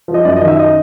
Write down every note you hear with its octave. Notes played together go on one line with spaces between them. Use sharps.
F3
D#5
F#2 D5
D#5
D#3
E5
D#5